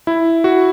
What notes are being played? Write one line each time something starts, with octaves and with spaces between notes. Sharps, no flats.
E4
F#4